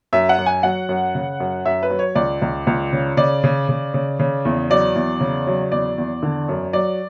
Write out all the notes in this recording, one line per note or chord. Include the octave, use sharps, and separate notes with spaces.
F#2 E5
F#5
F#2
G#5
F#3 F#5
F#2
C#3
F#2
F#2 E5
B4
F#3
C#5
C#2 D5
C#2
C#2
C#3
C#3 D5
C#3
C#3
C#3
C#3
E2
F#3 D5
E2
C#3
F#3
E2 D5
E2
D3
F#2
F#3 D5